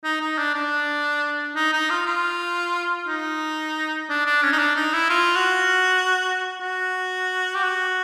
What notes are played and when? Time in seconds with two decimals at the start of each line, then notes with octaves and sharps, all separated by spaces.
0.04 D#4
0.21 D#4
0.38 D4
0.55 D4
1.55 D#4
1.73 D#4
1.90 F4
2.06 F4
3.07 D#4
4.09 D4
4.26 D4
4.43 C#4
4.52 D#4
4.59 D4
4.76 D#4
4.93 E4
5.10 F4
5.36 F#4
6.61 F#4
7.55 G4
7.63 F#4